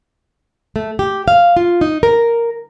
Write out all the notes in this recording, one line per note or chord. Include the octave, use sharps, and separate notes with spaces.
A3
G4
F5
F4
D#4
A#4